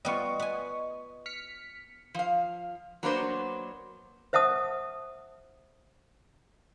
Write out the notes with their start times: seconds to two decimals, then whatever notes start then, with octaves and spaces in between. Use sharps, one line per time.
0.05 G3 B3 F4 D#5 C#6
0.40 B3 G#5
1.26 F6 B6 C#7
2.14 F3 F5
3.03 F#3 A#3 B3 D4 B4 C5
4.33 C5 E5 F#5 A5 D#6